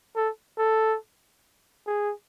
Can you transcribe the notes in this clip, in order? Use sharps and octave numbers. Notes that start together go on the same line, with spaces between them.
A4
A4
G#4